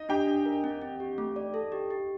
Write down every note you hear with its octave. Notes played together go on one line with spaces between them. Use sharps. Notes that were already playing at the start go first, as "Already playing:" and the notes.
Already playing: D#4 D#5
D4 G4 G5
D4
A#4
C4
C4
G4
A3
D5
A4
G4
G4